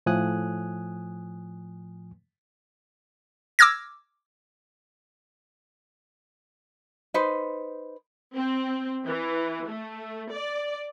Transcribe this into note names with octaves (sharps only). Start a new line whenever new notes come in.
A2 F3 G#5 D#6 F#6
D6 E6 F6 G#6 A#6
D#4 B4 C5
C4
E3
A3
D5